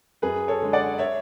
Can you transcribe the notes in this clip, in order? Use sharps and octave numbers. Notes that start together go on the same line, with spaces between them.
F#2 G#4 B4
A4 C#5
D3 G#3
D5 F#5
C#5 E5